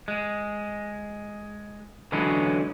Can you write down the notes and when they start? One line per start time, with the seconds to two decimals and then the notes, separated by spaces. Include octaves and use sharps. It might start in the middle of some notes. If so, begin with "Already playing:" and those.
0.08 G#3
2.12 D3 E3 F#3 G#3 C#4